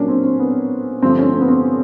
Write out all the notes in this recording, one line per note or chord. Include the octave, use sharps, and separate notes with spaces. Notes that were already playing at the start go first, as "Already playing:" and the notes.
Already playing: A#2 F#3 A#3 C#4 D4
C4
C4
B3
G2 D3 F3 A3 C4
C#4
C4
B3
C4